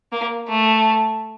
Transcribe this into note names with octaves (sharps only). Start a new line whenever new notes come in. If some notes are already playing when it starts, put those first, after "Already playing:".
A#3
A3